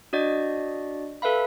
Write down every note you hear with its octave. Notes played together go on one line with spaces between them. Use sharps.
D4 F#4 D5 D#5
A4 B4 E5 F5 B5